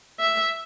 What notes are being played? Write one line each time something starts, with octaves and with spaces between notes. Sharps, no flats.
E5